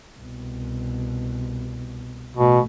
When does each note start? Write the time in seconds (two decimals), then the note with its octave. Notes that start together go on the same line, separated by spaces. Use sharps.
0.19 C2 B2
2.37 A1 B2 A3